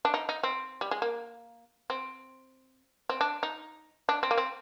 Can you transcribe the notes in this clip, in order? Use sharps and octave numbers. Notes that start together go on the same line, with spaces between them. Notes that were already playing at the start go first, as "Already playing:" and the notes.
D4
D#4
D#4
C4
G3
G#3
A#3
C4
C4
D4
D#4
D4
C4
A#3
C4